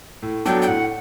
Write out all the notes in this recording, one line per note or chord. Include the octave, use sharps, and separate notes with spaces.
A2
F#3 B3 D4 A4 G5
G5
A2 F#5